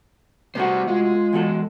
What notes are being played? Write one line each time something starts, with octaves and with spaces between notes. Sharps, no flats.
C3 G3 A3 F#4 C5
G#3 F4
E2 F#3 A4